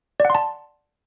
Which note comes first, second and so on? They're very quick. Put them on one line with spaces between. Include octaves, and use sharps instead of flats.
D5 F#5 C6 A5